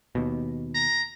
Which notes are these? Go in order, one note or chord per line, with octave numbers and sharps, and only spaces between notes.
D#2 B2
A#5